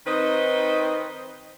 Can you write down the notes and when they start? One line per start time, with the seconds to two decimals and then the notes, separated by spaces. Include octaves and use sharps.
0.06 D#3 C4 D#4 B4 C5 D#5